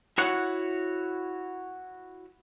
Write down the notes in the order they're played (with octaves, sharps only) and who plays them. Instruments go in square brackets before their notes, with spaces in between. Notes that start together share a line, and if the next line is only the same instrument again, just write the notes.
[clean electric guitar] E4 F#4 C#5 F#5